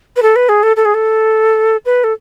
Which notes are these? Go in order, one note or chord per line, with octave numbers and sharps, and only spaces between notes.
B4
A4
B4
G#4
A4
A4
G#4
A4
B4
A4